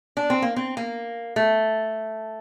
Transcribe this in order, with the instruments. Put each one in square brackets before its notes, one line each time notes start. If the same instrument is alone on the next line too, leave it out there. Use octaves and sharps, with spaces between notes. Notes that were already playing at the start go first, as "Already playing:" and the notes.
[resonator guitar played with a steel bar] D4
C4
A#3
C4
A#3
A3